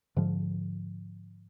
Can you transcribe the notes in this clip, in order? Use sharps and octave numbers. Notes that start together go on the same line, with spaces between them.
G#2 D3 F3